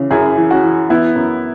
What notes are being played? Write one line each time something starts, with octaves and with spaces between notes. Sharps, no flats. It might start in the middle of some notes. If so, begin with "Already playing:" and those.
Already playing: C#3 E3
F#2 E4 G#4
E3
C#4 F#4
E3
E3 B3 E4
F#2